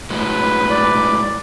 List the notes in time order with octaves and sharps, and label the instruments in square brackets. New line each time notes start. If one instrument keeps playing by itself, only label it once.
[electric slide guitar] A2 F#3 G#3 [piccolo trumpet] B4
[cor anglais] D5